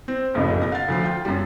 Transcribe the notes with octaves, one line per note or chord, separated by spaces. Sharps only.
C4
F#1 B1 F2 A2 C#3
F5 F#5 A6
D2 F3 C7
F4 G5
F#2 G3